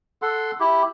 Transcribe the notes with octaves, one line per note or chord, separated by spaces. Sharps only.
A4 F#5 C6
E4 G4